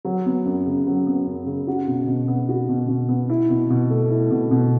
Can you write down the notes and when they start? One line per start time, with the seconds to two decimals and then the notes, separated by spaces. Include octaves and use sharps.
0.05 F#3
0.26 B3
0.45 F#2
0.66 C#3
0.87 F#3
1.07 B3
1.27 F#2
1.46 C#3
1.67 F#4
1.87 B2
2.07 B2
2.28 B3
2.49 F#4
2.69 B2
2.89 B2
3.09 B3
3.29 E4
3.50 B2
3.70 B2
3.90 A3
4.10 E4
4.31 B2
4.51 B2